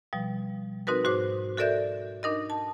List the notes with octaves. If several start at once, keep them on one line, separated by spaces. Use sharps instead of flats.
B2 F3 G3
C4 D#4 F#4 A#4 B4
G#2 F#4 C5 D6
F#4 A4 A#4 D5 E5 G6
D4 D#4 A#4 D#5
A5